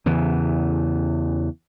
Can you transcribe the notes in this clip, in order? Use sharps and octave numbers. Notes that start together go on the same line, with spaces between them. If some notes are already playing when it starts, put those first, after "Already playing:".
E2 C#3 E3